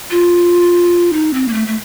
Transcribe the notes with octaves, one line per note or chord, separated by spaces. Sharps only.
F4
D#4
C4
A#3
A3
A3